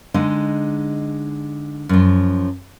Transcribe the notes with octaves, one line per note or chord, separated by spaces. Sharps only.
D3 G#3 D4 D#4
F#2 F3